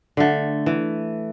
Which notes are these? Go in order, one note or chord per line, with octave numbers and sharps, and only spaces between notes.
D3 A3
E3